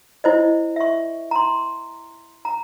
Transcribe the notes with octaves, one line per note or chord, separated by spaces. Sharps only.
E4 C5 D#5
E5 C#6
A#5 C6
A#5